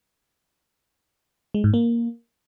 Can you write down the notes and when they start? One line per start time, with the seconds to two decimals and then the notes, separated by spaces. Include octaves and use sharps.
1.54 G#3
1.64 G#2
1.74 A#3